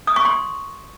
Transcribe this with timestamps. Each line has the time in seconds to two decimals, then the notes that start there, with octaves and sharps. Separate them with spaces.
0.07 D#6
0.16 C#6
0.25 C6